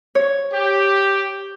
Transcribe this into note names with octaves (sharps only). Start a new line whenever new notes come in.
C#5
G4